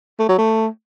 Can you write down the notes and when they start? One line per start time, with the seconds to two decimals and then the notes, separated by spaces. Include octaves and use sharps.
0.19 A3
0.29 F#3
0.38 A3